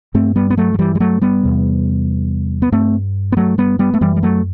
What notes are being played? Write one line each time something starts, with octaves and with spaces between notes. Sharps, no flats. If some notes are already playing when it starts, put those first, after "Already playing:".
G2 A3 C4
G3 B3
B3
F#3 A3
F#3
E3 G3
G3
F#3 A3
G3 B3
E2 C3
B3
G2 A3 C4
B3
F#3 A3
G3 B3
G3 B3
A3
F#2 E3 G3
G3
F#3 A3